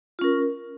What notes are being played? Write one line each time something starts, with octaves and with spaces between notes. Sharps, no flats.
C#4 F4 A#4